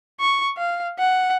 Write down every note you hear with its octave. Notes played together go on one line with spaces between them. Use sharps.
C#6
F5
F#5